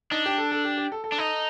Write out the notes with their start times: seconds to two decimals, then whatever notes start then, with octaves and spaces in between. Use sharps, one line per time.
0.11 D4 D#4
0.26 G4
0.38 A4
0.52 A4
0.65 G4
0.77 G4
0.92 A4
1.04 A4
1.12 D4
1.18 D#4